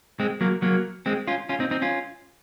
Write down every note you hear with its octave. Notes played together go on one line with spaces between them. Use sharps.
G#3 C4
F#3 A#3
F#3 A#3
G#3 C4
C#4 F4
C#4 F4
C4 D#4
C4 D#4
C#4 F4